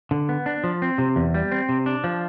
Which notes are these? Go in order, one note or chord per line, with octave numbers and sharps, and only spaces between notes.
D3
B3
D4
F3
C4
C3
E2
G3
C4
C3
D4
F3